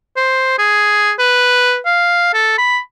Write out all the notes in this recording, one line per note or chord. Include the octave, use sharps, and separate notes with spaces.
C5
G#4
B4
F5
A4
B5